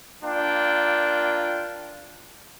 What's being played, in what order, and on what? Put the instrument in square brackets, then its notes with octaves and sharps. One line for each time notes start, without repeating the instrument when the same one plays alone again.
[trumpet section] A#3 D4 F4 G5